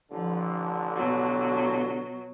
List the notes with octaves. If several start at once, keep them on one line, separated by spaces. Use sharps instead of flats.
A1 D3 F3
B2 F#3